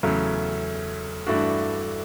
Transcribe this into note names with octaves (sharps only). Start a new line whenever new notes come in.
E2 C#3 F#3 A3
G2 E3 A3 D4 F#4